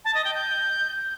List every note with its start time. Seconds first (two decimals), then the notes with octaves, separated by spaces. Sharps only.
0.05 A5
0.15 D#5
0.25 G5
0.34 G6